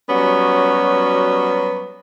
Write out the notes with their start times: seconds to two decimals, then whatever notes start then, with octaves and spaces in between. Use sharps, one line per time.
0.10 F#3 G3 B3 C#4 F#4